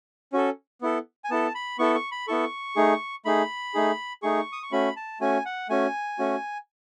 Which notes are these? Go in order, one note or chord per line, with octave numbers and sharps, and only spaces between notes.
C#4 F#4 A4
B3 E4 A4
G#5
B3 E4 A4 A5
B5
B3 E4 A4 C#6
C#6
B5
B3 E4 A4 C#6
A3 D#4 G#4
A3 D#4 G#4 B5
A3 D#4 G#4
A3 D#4 G#4 C#6
D#6
C#6
A3 C#4 F#4 B5
A5
A3 C#4 F#4 G#5
F#5
A3 C#4 F#4 G#5
A3 C#4 F#4